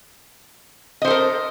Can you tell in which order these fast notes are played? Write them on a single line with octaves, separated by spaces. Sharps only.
D#5 C5 A4 A#4